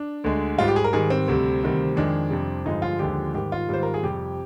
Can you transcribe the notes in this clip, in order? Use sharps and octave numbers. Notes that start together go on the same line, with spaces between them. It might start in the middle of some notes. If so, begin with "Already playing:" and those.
Already playing: D4
D2 D3 G#3
G#2 G3 F4
G4
G#4
A#4
G#2 D#3 G3 G#4
C4
D2 C3 G3
D2 C3 D#3 G3
F2 D#3 G#3 D4
F2 C3 G3
G2 D3 F3 G#3 D#4
F4
D#2 D3 F3 G#3 G4
G#2 D#3 G3 G4
F4
G#2 D#3 G3 C5
A#4
G#4
F2 C3 G3 G4